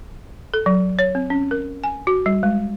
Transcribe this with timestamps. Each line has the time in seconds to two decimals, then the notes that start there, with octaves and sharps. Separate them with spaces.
0.54 A4
0.66 F#3
0.99 C#5
1.15 C4
1.30 C#4
1.51 A#4
1.84 G#5
2.07 F#4
2.26 G3
2.43 G#3